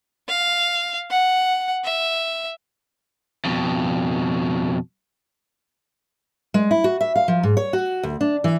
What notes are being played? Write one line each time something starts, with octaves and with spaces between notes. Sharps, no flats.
F5
F#5
E5
F2 B2
G#3
E4
F#4
E5
F5
F3
G#2
C#5
F#4
D2
D4
E3